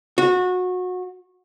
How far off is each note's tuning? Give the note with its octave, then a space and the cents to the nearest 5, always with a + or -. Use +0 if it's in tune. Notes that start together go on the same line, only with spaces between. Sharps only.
F#4 -25